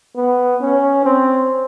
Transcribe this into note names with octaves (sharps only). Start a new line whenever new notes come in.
B3
C#4
C4